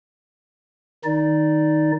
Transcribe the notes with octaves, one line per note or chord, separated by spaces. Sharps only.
D#3 D#4 D5